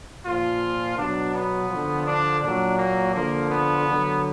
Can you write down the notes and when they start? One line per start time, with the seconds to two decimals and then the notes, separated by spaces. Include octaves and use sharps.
0.25 A#2 F3 F4
0.97 B2 F#3 D4
1.34 B3
1.69 D3 F3
2.06 D4
2.43 A#2 F#3 D4
2.78 A#3
3.14 D3 F3 A#3
3.50 B3
3.87 D3 F#3